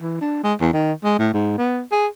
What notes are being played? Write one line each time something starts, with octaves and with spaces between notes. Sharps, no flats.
E3
D4
G#3
E2
D#3
G#3
A2
G#2
B3
G#4